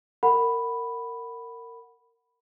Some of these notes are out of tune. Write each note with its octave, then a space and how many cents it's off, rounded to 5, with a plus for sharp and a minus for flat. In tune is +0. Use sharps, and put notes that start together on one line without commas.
A#4 -20 F#5 +0 B5 +0